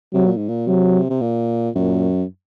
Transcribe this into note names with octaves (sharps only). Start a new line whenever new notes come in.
C3 F#3
A#2
G#2
A#2
C3 F#3
C3
A#2
F#2 A#2